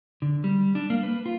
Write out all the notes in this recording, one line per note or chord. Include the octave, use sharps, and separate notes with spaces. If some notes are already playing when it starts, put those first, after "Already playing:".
D3
G3
D4
A#3
B4
F4